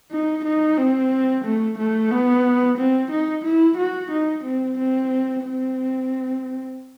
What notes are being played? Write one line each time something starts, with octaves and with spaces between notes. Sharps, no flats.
D#4
D#4
C4
A3
A3
B3
C4
D#4
E4
F#4
D#4
C4
C4
C4